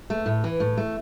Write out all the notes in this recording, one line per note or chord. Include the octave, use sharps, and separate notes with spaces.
A3
A2
E3
A2
A3